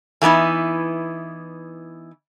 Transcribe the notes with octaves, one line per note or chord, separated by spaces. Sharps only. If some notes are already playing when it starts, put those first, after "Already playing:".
E3 A3 B3 D#4 E4